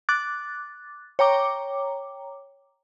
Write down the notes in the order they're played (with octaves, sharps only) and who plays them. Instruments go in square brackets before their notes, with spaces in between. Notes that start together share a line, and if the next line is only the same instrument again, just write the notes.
[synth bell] D6 F#6 A6
C#5 G5 A#5 D6